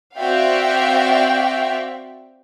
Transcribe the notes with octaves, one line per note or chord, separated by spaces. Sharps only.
C4 F#4 D5 E5 F5 G5